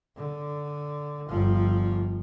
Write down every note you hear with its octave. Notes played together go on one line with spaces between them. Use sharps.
D3
G1 F3